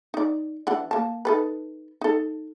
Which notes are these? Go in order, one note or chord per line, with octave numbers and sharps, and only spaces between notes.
D#4 D5
E3 D4 F#5
A#3 A5
D#4 A4 B4
D#4 A4